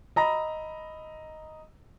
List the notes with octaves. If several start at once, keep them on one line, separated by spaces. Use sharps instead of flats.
D#5 A#5 B5 A#6